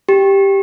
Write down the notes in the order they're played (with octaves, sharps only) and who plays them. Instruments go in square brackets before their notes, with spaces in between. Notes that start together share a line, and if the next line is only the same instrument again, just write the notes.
[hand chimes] G4